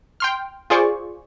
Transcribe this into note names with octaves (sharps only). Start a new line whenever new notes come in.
G5 C6 F6
F4 G#4 C5 D5 C#6